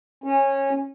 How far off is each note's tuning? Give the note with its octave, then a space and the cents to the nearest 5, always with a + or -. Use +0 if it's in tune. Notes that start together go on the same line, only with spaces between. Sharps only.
C#4 -20